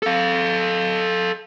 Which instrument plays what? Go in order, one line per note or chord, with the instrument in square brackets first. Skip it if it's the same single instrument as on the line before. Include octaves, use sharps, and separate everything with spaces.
[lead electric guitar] A4 F5